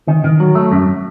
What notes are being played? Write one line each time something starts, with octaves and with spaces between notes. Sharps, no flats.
D#3
D#3
F#3
A3
F#2